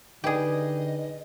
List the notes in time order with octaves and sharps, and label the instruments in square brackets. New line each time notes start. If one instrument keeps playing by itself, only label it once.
[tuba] D3 [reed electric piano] D#4 B4 D5 [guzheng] G4 G#4 [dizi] D#5